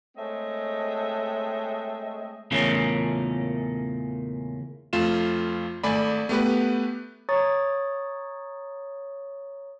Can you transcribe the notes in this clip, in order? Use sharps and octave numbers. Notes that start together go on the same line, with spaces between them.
G#3 A3 C4 C#5 D#5 E5
E2 A#2 C#3 A3 A#3 C#4
F2 A3 F4 E7
G#1 A3 D5 G#5 B5
A3 B3 G4 B4
C#5 A#5 C#6 D#6 A6